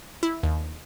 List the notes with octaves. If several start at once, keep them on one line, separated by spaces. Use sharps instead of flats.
E4
D#2